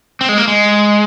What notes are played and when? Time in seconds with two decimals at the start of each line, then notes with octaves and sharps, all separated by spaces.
0.21 C4
0.29 G#3
0.38 A#3
0.48 G#3